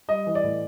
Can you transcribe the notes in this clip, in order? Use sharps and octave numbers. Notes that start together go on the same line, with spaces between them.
G3 D#5
E3
D5
A2